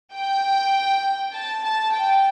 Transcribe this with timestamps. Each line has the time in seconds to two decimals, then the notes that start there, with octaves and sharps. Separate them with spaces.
0.15 G5
1.33 A5
1.63 A5
1.93 G5